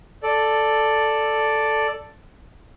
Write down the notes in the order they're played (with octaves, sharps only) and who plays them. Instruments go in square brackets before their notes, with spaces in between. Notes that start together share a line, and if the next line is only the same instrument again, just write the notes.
[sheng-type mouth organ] A4 D5